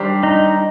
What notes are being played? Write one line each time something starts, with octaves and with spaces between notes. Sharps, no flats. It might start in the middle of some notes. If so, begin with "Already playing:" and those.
Already playing: D#3 G3 D4 G4 C5
D#4